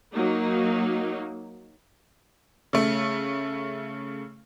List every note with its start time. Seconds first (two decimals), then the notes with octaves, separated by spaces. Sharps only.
0.13 F#3 A#3 D#4
2.73 C#3 A3